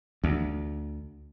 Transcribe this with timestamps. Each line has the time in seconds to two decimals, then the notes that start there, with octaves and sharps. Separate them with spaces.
0.24 D2